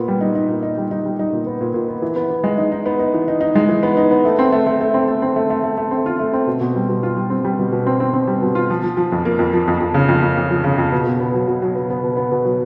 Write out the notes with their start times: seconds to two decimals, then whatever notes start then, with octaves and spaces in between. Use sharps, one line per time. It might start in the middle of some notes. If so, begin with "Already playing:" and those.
Already playing: A#2 B3
0.08 G3
0.21 D#4
0.35 D#4
0.49 A#2
0.63 D#4
0.77 G3
0.91 D#4
1.05 G3
1.19 D#4
1.32 A#2
1.46 B3
1.61 A#2
1.74 A#2
1.88 B3
2.02 E3
2.16 B3
2.29 B3
2.44 G#3
2.58 D#4
2.72 D#4
2.86 B3
2.99 D#4
3.14 E3
3.28 D#4
3.41 D#4
3.56 G#3
3.69 E3
3.83 B3
3.97 D#4
4.11 B3
4.25 A3
4.39 C4
4.52 A3
4.67 A3
4.81 A3
4.94 C4
5.08 A3
5.22 C4
5.36 A3
5.50 A3
5.63 A3
5.78 A3
5.91 C4
6.06 F4
6.19 A3
6.33 C4
6.47 B2
6.61 B2
6.76 G3
6.89 B2
7.03 F4
7.17 G3
7.30 C4
7.44 G3
7.59 B2
7.72 B2
7.87 C4
8.00 C4
8.14 C4
8.27 G3
8.42 B2
8.55 F4
8.70 F3
8.83 F3
8.97 F3
9.12 F2
9.25 A#3
9.39 F2
9.53 F3
9.68 F2
9.80 F2
9.94 C#3
10.09 F2
10.22 F2
10.37 F2
10.50 F3
10.64 C#3
10.78 F2
10.92 B2
11.07 B2
11.20 B3
11.34 F#3
11.48 B2
11.62 F#3
11.75 B3
11.90 B3
12.04 B2
12.17 B3
12.32 B2
12.45 F#3